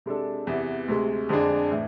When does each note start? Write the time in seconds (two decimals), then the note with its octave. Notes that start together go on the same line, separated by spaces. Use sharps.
0.06 C3 G#3 D4 A4
0.47 E2 C3 E3 B3
0.88 D2 C3 G#3
1.29 F2 D3 G#3 D4 G#4
1.71 A2 E3